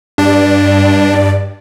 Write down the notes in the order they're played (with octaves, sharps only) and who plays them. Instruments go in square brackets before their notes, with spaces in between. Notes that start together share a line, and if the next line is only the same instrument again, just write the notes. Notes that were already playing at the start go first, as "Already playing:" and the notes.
[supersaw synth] G2 D5 [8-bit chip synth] D4